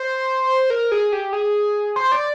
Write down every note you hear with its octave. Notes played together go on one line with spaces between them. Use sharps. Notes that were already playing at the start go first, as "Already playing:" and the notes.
Already playing: C5
A#4
G#4
G4
G#4
C5
D5